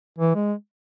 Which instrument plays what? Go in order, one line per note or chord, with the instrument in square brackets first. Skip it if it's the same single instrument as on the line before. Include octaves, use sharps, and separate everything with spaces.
[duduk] E3
G#3